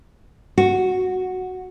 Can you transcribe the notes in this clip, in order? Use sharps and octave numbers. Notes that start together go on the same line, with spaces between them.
F#4